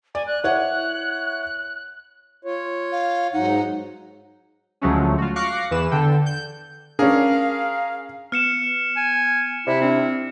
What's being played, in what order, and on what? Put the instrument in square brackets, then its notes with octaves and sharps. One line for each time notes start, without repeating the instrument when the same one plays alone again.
[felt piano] D5 [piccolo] G#5
[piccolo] F#6
[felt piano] E4 C#5 F#5 [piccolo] F#6
[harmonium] F4 C#5
[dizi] F5
[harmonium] G#2 F#3 F#5 [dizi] D#4
[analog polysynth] D2 F3 F#3 G#3 A3 C#4
F4 F#4
F5 C#6 D6 F#6 A#6 C7
E2 E3 B4 E7
D3 A4 G5
G6
[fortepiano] C#4 D4 [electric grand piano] G#4 A#4 [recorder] F5
[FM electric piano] B3 [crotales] F6 C#7 E7
[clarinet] G#5
[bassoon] C3 [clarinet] E4 [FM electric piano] D5
[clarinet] C4 [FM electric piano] D4 E4